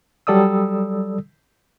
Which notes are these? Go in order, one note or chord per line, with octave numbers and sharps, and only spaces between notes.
F#3 G3 A4 D5 D#6 E6